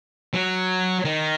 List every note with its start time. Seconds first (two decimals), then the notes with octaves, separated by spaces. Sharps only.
0.34 F#3
1.05 D#3